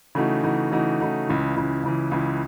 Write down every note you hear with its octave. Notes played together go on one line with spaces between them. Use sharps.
C#3 E3 A3 D#4 F#4
C#3 E3 A3 D#4 F#4
C#3 E3 A3 D#4 F#4
C#3 E3 A3 D#4 F#4
C#2 C#3 E3
C#2 C#3 E3
C#2 C#3 E3
C#2 C#3 E3